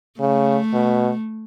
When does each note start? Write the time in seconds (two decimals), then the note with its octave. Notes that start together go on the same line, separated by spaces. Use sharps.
0.20 C#3 A3
0.73 B2